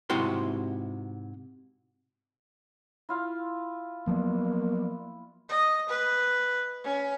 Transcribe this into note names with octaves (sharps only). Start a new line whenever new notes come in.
G#2 C3 E4 F#4 G5 C6
E4 F4 F5
F3 F#3 A#3 B3
D#5
B4
C#4